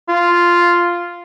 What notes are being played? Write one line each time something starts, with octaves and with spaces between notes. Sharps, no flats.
F4